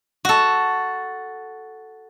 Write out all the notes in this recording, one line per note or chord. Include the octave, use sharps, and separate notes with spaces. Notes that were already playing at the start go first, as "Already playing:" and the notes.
F#4 A4